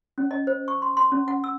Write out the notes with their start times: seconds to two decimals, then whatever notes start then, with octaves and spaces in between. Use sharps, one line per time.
0.18 C#4
0.31 D#5
0.47 C5
0.68 C#6
0.82 C6
0.97 C6
1.12 C#4
1.28 F#5
1.44 E6